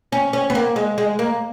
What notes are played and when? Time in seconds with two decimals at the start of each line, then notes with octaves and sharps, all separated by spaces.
0.12 C#4
0.33 C#4
0.50 B3
0.55 A#3
0.76 G#3
0.98 G#3
1.19 A#3